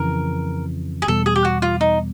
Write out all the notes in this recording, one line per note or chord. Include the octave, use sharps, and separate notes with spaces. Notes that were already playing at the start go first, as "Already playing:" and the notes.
Already playing: F2 C#3 E3 A#4
G#4
E2 B2 G3 B3 A4
G#4
G4
F#4
F4
D#4